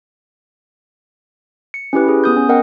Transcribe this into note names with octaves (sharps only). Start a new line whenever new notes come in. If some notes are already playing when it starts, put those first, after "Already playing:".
C#7
C#4 E4 G4 B4
G#4
B3 D#6 G6
C#4
B3 A#4 D#5 F#5 G5